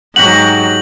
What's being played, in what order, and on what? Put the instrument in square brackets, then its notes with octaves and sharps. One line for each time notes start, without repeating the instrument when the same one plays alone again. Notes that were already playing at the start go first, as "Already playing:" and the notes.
[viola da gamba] G#2 F#3 [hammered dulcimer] F#4 G4 F#5 [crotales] F#7